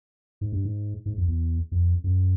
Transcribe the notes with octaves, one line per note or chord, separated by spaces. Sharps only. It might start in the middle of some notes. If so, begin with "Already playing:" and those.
G#2
G2
G#2
G#2
F2
E2
F2
F#2